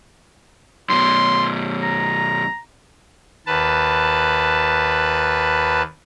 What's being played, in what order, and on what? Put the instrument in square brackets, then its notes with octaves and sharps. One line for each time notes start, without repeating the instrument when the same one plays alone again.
[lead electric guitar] F#2 B2 [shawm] C6
[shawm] A#5
[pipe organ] D#2 B4 A5